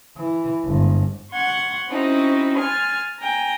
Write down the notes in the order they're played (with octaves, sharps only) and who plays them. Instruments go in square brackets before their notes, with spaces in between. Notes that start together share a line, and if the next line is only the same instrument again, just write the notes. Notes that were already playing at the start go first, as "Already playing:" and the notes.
[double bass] E3
G1 G#2
[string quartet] F#5 C6 C#6 G#6
C4 C#4 D#4 E4 F#4
G#5 C6 F6 G#6 A6
G5 G#5 A#5